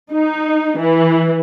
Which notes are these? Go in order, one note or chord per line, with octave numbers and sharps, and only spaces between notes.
D#4
E3